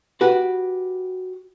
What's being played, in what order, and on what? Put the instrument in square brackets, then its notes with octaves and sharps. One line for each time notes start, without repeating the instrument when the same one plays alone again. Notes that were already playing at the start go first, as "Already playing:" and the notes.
[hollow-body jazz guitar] F#4 G4 B4